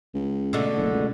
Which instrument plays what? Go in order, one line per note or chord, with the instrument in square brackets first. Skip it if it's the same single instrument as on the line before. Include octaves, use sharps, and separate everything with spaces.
[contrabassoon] C#2
[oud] B2 D3 A3
[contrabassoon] F#1
C#2